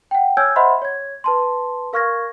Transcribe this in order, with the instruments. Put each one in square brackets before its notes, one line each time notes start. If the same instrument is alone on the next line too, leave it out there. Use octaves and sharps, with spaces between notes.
[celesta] F#5 G5
C#5 G#5 E6 F6 G6 G#6
C5 D#5 E5 F#5 B5 C6
C#5 G#6
B4 A5 C6
A#4 F5 C#6 F6 G#6 A#6